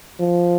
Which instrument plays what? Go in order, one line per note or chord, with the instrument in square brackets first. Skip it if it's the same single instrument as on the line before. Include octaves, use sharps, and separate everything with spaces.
[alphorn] F3